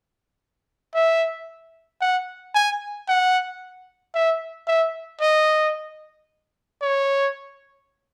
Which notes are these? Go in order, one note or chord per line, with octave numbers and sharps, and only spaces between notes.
E5
F#5
G#5
F#5
E5
E5
D#5
C#5